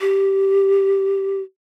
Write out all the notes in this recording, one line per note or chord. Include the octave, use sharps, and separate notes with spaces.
G4